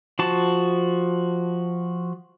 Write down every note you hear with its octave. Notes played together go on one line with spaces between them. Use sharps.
F3 F#4 A5